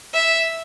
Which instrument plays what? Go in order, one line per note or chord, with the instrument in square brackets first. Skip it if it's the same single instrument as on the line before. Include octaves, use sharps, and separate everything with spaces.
[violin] E5